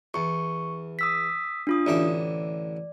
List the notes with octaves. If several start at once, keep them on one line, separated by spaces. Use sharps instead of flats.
E2 C#6
D#6 E6 B6
D4 F4 D#6
A1 D3 D5 E5